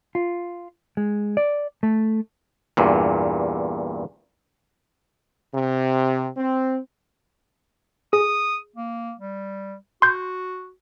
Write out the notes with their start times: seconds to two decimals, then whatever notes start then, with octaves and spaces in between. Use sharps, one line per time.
0.15 F4
0.97 G#3
1.37 D5
1.83 A3
2.77 E2 G2 A#2
5.54 C3
6.37 C4
8.13 G#4 D#6
8.76 A#3
9.19 G3
10.02 F#4 C6 G6